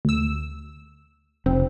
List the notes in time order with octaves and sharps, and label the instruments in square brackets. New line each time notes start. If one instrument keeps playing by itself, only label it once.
[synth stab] D2 E6
[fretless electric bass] F1 [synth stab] C4